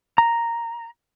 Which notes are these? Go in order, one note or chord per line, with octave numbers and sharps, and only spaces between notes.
A#5